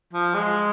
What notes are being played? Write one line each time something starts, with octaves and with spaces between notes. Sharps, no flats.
F3
G#3